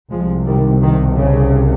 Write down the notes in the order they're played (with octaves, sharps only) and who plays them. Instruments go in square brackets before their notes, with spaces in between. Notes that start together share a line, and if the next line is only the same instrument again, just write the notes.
[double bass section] C2 C3 F3 G#3
D#3 G3
D#3
C#3